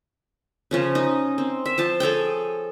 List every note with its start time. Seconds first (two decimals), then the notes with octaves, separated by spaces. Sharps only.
0.71 C#3 F3 C#4
0.95 D#4
1.38 C4
1.66 E5
1.78 F3 C5 A5
2.00 G#4 A4 C#5 G5